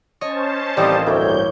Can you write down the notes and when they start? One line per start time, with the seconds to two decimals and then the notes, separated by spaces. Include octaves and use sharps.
0.21 C#4 C5 C#5 D#5 A5
0.77 A1 D#3 F3 G3 C4 D#5 D#6
1.06 D2 G2 A#3 E4 C#5 G6